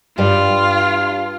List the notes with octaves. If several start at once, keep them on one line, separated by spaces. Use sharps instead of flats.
G2 F4 G4 D5